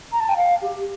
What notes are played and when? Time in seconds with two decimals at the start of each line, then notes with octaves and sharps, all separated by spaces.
0.12 A#5
0.20 A5
0.29 G5
0.37 F5
0.62 G4